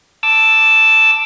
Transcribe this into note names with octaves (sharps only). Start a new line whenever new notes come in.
A5 D6 E6